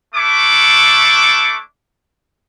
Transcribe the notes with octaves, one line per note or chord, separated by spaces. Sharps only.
A3 D4 E4 C#6 D6